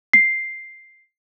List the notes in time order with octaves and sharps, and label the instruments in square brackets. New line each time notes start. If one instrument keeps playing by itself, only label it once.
[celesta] C7